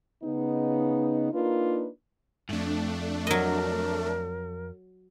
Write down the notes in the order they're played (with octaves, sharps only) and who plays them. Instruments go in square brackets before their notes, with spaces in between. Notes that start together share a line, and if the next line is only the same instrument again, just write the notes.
[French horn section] C#3 B3 D#4
A#3 D4 D#4 F4 A#4 B4
[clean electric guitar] F2 G#2 [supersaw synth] A3 D4
[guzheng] F#3 D#5 [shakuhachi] A#4